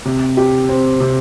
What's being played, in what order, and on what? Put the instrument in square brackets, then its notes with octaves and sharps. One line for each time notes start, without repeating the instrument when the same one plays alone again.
[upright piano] C3
G4
C4
C3